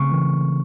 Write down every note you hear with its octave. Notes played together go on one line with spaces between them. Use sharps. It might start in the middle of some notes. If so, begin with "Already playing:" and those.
Already playing: C#3 A3 C4 C#6
E3